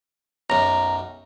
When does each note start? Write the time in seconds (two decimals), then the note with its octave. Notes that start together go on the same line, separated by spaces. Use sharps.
0.50 B1 F#2 A#5